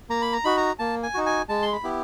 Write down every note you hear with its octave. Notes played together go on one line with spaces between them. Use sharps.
A#3 A#5
B5
A#5
D#4 F#4 B5
A#5
A#3 A5
G#5
D#4 F#4
G#5
G#3 A5
C6
B5
B3 E4 G4